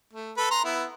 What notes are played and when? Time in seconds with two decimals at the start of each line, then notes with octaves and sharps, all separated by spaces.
0.13 A3
0.37 A4 B4
0.51 A#5 C6
0.65 B3 E4